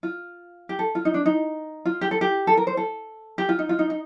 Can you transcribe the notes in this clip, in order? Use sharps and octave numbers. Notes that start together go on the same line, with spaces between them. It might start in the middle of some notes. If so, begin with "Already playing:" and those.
F4
G4
A4
F4
D#4
D4
D#4
F4
G4
A4
G4
A4
A#4
C5
A4
G4
F4
D#4
F4
D#4
D#4